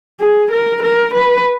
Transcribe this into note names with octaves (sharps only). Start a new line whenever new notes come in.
G#4
A#4
A#4
B4